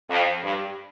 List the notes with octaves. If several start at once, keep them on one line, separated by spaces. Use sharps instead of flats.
F2
G2